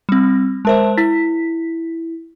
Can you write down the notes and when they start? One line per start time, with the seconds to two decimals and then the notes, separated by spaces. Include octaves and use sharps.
0.09 G3 C4
0.65 G#3 A#4 C5 E5 A5
0.97 E4 B6